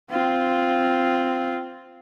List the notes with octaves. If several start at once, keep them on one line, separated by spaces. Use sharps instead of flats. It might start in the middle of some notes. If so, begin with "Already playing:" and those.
C4 F4